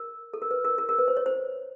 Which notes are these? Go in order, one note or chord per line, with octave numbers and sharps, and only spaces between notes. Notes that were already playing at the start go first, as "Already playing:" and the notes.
Already playing: A#4
A4
A#4
B4
A#4
A#4
A#4
B4
C5
C#5
C5